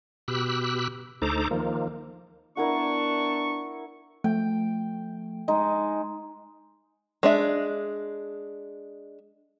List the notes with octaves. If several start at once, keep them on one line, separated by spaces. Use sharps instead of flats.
B2 G4 B5 E6 F#6
D2 D#4 A4 C5 A#5 D6
D#3 F3 A#3
B3 D4 E4 A#4 F#5 C#6
F3 A3 G5
G#3 D#4
G#3 D4 E5